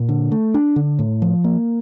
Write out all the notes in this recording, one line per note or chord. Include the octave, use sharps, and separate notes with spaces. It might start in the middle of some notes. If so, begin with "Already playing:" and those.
Already playing: A#2
D3
A3
D4
D3
A2
F3
A#3